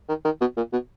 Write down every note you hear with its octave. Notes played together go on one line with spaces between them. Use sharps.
D#3
D#3
B2
A#2
B2